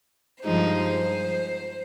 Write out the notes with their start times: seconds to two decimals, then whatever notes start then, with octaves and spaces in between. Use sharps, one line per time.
0.43 G2 F3 G#3 D#4 C5